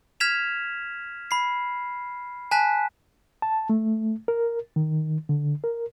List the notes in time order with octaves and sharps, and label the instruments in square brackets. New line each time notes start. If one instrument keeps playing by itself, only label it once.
[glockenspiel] F6 G#6 B6 E7 F7
B5 C7
G#5 A5 F#6 B6
[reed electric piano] A5
A3
A#4
D#3
D3
A#4